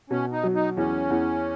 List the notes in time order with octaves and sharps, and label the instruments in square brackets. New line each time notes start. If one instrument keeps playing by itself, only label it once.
[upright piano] B2 [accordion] C#4
[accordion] D#4
[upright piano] F#3
[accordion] D#4
[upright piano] E2 [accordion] C#4
[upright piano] E2